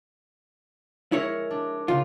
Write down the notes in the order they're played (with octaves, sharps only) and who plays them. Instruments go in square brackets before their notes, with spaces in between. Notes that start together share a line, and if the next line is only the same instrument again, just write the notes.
[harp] G#3 A#4 [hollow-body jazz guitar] E4 C#5
[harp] D4
[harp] C#3 [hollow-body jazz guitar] F4